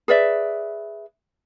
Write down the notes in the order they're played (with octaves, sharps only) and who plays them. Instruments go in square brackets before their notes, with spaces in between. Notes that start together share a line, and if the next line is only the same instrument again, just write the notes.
[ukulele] G#4 B4 D5 E5